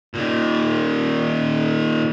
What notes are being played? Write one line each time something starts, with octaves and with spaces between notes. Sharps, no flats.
A#2 D#3